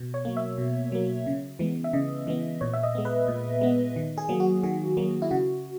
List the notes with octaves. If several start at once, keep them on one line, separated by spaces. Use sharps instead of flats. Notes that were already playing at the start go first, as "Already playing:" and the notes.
Already playing: B2
C#5
F#3 A#3
E5
B2
F#3 A#3
C#3
E3 G#3 B3
E5
C#3 D#5
E3 G#3 B3
A#2 C#5
E5
D#5
G#3 B3
B4
A#2
G#3 B3
D#3
G#4
F#3 A#3
F#4
D#3 G#4
F#3 A#3
E4
C#3 F#4